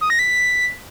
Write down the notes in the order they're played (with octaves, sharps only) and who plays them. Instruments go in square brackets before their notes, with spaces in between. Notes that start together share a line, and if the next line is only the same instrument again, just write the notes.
[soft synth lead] D#6
A#6
B6